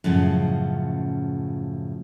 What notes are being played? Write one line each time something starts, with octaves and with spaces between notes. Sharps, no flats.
F#2 A2 C#3 F3